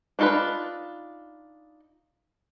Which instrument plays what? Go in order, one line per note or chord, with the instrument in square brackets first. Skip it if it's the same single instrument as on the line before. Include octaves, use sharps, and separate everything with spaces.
[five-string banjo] D4 D#4 F4 A4 B4